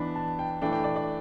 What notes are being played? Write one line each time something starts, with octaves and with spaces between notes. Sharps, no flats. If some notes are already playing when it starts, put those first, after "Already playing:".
Already playing: E3 B3 D4 B5
A5
G5
E3 A3 D4 G5
G5
D5
D5